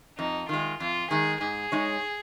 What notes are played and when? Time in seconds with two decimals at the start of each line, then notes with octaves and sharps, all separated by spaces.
0.18 F2 D#4
0.49 D#3 G#3 F4
0.80 F2 F4
1.11 D#3 G#3 G#4
1.41 G#2 G#4
1.72 G#3 D#4 C#5